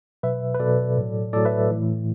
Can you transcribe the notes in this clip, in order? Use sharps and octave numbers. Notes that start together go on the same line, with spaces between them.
B2 F#3 B4 E5
B4
B2 F#3 A4 D5
A2 F#3
A2 F#3 A4 D5
B4 E5
A2 E3